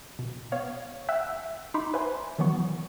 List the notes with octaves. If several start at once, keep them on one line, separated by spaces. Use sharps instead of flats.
B2
B3 C#5 F5
E5 F#5 G5 E6 F#6 B6
D#4 B5 C6 D6
B4 C5 E5 G#5 C6
D#3 E3 F#3 B3 C#6